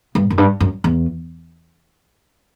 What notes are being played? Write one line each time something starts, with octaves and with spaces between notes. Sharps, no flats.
G2
F#2
G2
F#2
E2